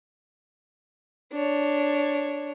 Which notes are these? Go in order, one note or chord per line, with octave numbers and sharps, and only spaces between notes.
D4 C#5